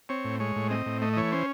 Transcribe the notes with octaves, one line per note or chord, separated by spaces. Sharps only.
C4 C#5
A2
G#3 C#5
A2
C4 D#5
A2
A3 D#5
D#5
E3 C#5
C#4 C5